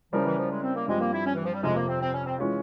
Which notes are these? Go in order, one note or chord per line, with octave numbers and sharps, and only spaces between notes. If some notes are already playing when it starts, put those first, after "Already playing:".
C#3 F3 G3 C#4 E4 A#4
E3
F3
G#3
C4
A#3
G2 F3 G#3 C4 G4
A#3
E4
C#4
E3
F3
G3
F2 C3 F3 G#3
A#3
C4
C4
C#4
C4
E3 G#3 C#4 F4